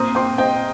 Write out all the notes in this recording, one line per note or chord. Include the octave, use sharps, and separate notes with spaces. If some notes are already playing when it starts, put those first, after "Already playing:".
Already playing: A#2 C4 A#5 D#6
C4 G5 C6
C4 D#5 G5